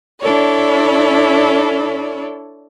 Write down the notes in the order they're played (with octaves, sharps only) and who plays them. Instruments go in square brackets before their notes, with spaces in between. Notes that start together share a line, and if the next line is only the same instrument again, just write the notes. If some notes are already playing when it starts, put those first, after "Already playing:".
[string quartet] D4 E4 A4 C#5 D5